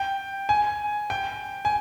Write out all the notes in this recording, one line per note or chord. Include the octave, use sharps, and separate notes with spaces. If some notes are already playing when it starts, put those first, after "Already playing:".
Already playing: G5
G#5
G5
G#5